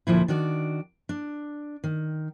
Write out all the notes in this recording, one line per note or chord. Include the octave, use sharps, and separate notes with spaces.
D2 A#2 F3 E4
D#3 D4 F#4 D5
D4
D#3